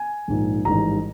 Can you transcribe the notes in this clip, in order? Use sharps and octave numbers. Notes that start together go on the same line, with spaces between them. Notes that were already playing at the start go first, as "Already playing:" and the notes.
Already playing: G#5
A#1 G#2 D#3
A1 G#2 D#3 G3 A#5